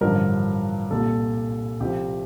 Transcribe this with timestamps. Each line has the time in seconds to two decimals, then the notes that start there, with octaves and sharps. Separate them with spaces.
0.01 A1 G2 D3 F3 A#4
0.91 C2 A#2 G3 A4
1.80 C2 C3 F3 G4